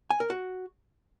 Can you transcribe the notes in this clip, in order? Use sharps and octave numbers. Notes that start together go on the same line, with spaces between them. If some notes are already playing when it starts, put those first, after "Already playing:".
G#5
A#4
F#4